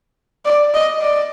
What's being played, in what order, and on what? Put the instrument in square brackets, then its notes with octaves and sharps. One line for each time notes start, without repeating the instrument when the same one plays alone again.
[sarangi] D5
D#5
D5